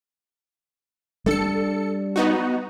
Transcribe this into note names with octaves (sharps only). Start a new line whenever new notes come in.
G3 D4 A4 C#7
B3 D#4 F#4